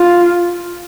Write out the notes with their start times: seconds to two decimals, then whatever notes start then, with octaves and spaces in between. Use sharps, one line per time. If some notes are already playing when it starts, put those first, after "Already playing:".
Already playing: F4